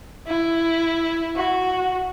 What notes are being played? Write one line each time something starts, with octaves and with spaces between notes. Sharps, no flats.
E4
F#4